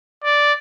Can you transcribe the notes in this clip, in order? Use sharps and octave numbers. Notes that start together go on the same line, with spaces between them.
D5